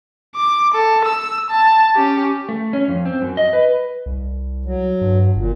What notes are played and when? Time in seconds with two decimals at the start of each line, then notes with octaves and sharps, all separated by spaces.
0.35 D6
0.74 A4
1.05 E6
1.50 A5
1.96 C#4 G4
2.49 A3
2.73 C#4
2.88 F2
3.06 C4
3.22 F#2
3.37 D#5
3.53 B4
4.06 C2
4.65 F#3
5.02 G2
5.36 G1 A#2